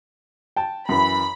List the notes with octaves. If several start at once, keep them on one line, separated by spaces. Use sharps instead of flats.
G5 A5
F#2 E3 B5